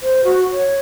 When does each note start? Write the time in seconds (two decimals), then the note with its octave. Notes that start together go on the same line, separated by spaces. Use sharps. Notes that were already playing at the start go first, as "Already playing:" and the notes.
0.01 C5
0.24 F#4
0.51 C#5